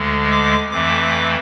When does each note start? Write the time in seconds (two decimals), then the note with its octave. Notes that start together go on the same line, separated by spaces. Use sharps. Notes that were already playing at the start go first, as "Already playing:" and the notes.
Already playing: D2 D3 G#3
0.31 D6
0.71 F2 E3 A3 D6